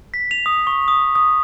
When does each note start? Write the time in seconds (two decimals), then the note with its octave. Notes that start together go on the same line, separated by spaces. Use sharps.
0.14 B6
0.31 F7
0.46 D#6
0.67 C#6
0.88 D#6
1.15 D#6